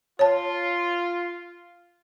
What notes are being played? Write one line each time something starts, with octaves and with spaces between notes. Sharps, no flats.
F4 C#5 A5